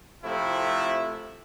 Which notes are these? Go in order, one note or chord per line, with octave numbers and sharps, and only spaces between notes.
C3 F3 A3 E4